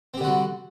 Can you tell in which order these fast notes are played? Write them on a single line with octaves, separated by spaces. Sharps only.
C4 G4 D3 F#4 G3